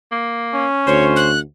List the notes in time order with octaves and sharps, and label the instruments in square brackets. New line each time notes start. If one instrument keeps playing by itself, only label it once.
[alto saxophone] A#3
[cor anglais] C#4
[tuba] D2 [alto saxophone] C5 [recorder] C#5
[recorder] F#6